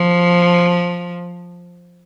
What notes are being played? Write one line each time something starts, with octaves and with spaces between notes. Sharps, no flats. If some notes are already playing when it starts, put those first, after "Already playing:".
Already playing: F3